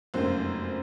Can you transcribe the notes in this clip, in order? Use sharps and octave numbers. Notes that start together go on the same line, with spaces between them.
F1 F#2 A#3 C5